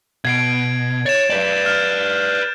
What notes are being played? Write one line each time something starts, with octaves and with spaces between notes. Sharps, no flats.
B2 G#6 C7 D7
C#5 A6 E7
B4 D5
F6 G6